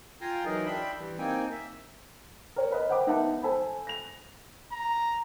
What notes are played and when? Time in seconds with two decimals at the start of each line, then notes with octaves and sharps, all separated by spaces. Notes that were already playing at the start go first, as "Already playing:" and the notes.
0.21 F4 G5 G#5 A#5 C6
0.45 E3 F#3 D#4 G#4 A#4 D#5
0.66 D4 E5 G5 B5 C6
0.98 E3 G3
1.18 A#3 C4 D#4 G5 G#5
1.52 E5
2.56 A#4 C#5
2.71 A#4 B4 D#5
2.89 C5 F#5 G5 B5 D6
3.07 B3 D#4 A#4 E5 F#5 A5
3.43 A4 C5 G#5 B5
3.87 A#6 F7
4.72 A#5